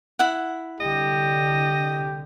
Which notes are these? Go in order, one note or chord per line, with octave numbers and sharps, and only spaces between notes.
E4 F#5
C2 D3 G4 D#5